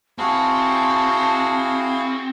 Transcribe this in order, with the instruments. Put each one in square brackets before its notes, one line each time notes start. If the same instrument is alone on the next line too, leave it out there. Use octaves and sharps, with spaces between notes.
[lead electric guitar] C4 [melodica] E4 G#4 F5 [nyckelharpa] F#4 [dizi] A5